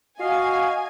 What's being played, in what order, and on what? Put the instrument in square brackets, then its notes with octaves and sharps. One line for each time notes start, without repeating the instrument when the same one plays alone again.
[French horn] F#4 [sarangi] D#5 [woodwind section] F5 [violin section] G#5